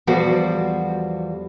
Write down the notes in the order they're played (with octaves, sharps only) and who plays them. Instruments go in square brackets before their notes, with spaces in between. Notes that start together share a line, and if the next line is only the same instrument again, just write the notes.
[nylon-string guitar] E2 F3 G3 F#4 A4 C5